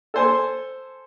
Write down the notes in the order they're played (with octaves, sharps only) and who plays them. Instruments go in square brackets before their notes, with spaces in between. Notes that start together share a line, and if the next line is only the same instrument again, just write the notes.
[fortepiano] A4 C5 G#5